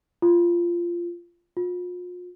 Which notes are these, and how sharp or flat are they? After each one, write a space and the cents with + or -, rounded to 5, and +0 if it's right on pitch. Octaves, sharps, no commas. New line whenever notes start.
F4 -15
F4 +40